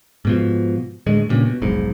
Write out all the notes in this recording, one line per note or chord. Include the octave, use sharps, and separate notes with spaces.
G#2 B2 F3
D2 A2 G#3
G2 A#2 C#3
B2
F1 B1 G#2